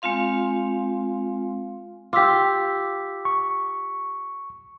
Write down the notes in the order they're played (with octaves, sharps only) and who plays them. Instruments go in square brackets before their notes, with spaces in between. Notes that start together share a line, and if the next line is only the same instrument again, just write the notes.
[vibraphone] G#3 C4 F4 F5 C6
[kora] F4 G4 [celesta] D6 E6 B6
[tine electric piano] C#6